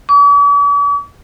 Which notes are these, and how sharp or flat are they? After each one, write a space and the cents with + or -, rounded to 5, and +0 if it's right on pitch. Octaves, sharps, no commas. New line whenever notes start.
D6 -45